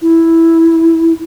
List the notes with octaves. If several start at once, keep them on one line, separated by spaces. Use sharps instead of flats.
E4